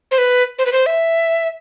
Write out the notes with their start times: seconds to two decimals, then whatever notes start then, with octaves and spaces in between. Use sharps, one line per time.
0.11 C5
0.18 B4
0.59 C5
0.66 B4
0.73 C5
0.86 E5